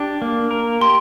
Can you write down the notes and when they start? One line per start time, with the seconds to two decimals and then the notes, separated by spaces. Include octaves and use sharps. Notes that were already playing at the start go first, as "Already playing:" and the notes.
Already playing: D4 G4
0.22 A#3
0.51 A#4
0.81 G4 C6